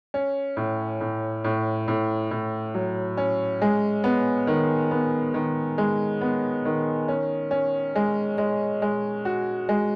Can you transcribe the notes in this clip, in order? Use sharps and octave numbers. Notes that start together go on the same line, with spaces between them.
C#4
A2
A2
A2
A2
A2
F#3
C#4
G#3
B3
D#3
B3
D#3
G#3
B3
D#3
C#4
C#4
G#3
G#3
G#3
F#4
G#3